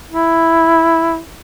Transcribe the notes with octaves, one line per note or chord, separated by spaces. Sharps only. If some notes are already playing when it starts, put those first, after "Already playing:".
E4